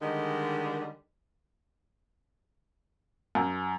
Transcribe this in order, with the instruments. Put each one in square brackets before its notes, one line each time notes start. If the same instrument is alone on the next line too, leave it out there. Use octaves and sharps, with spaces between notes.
[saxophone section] D3 D#3 G3 G#3
[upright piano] F#2